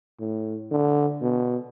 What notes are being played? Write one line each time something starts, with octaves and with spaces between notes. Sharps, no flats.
A2
D3
B2